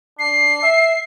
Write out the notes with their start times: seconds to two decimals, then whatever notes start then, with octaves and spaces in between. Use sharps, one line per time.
0.19 D4 C7
0.63 E5